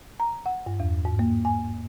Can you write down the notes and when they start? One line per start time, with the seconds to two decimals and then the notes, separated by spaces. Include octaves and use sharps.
0.20 A#5
0.46 F#5
0.66 G2
0.80 E2
1.05 G#2
1.19 A#3
1.45 G#5